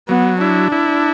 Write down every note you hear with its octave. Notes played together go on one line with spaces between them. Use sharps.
F#3 B3
D4 E4
E4